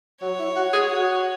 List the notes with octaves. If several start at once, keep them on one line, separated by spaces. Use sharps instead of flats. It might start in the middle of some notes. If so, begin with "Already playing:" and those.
F#3 C#5
E4
F#4
G#4
F#4